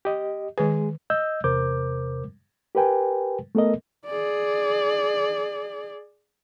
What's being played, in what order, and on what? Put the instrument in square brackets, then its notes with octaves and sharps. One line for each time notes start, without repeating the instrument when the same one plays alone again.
[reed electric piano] G4 D#5
[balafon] D#3 B4 [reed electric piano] G#3 G#4
[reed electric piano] D#5 E6 G6
E2 C3 A#4 C5 D6 G6
G4 A#4 B4 G5 G#5
A3 B3 A4 A#4 D#5
[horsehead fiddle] G#4 D5